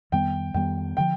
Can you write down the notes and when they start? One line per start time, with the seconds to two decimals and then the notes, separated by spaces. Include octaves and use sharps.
0.12 F2 D#3 G3 B3 G5
0.54 F2 D#3 G3 B3 G5
0.97 D3 F3 G5